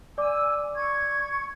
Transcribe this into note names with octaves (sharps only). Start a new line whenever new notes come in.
D5 G#5 D6 E6
C#6 G#6